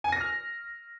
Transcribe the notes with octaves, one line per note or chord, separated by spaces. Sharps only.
G#5
A#6
F6